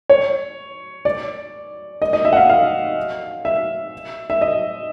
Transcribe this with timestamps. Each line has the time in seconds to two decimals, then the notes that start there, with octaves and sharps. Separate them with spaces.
0.10 C#5
1.05 D5
2.02 D#5
2.13 D#5
2.25 E5
2.33 F#5
2.37 F5
2.50 F5
3.45 E5
4.30 E5
4.41 D#5